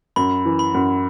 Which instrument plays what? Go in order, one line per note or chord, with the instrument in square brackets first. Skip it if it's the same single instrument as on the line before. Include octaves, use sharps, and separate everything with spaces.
[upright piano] F#2 [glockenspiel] B5
[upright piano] E3
[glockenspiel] B5
[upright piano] F#2